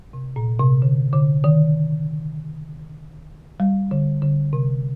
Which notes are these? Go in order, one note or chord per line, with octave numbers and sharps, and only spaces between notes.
C3
A#2
C3
D3
D3
D#3
G3
D3
D3
C3